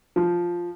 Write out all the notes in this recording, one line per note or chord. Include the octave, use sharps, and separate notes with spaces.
F3